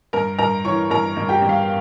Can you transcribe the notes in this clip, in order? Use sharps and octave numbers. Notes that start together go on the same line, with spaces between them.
G2 A#4 A#5
G2 A#4 A#5
E3 C#5 C#6
G2 A#4 A#5
G2
G4 G5
G2
F5